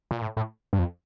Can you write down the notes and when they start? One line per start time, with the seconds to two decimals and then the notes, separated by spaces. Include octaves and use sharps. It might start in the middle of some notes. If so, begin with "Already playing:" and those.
0.11 A#2
0.22 A2
0.37 A2
0.73 G2
0.79 F2